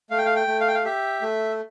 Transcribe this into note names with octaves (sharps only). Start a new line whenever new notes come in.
A3 F5
G5
F5
G5
A3
F5
G5
F5
G4 E5
A3